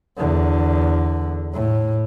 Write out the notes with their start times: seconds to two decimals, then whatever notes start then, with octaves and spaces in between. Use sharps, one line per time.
0.17 E2 D3
1.54 A2